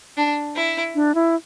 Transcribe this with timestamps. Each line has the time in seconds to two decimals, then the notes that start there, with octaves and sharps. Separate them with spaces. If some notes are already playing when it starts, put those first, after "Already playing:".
0.17 D4
0.56 E4
0.95 D4
1.15 E4